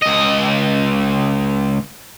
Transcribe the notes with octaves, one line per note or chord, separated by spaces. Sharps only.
C#2 D#5